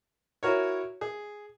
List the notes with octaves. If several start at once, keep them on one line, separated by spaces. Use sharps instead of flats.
E4 F#4 A#4 C#5
G#4